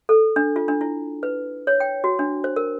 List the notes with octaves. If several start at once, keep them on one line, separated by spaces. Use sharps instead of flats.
A4
D4
F4
D4
E4
B4
C#5
G5
F#4
D4
C5
A#4